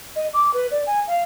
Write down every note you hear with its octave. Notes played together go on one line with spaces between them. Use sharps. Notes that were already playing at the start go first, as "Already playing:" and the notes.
D#5
D6
B4
D5
G#5
F5